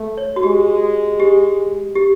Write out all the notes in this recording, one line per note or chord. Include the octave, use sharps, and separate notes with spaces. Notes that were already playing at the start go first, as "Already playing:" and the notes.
Already playing: A3
C#5
F#4
G#3 G4
G4
G4